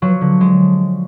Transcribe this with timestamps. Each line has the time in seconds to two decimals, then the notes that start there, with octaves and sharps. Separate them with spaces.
0.02 F3 F#3
0.21 D3
0.41 G#3